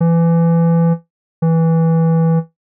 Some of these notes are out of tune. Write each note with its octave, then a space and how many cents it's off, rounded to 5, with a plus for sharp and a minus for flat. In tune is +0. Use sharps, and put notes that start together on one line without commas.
E3 +25
E3 -10